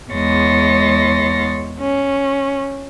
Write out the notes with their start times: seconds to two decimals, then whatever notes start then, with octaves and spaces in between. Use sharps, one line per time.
0.11 E2 G#3 C#5 C6 A6 A#6
1.79 C#4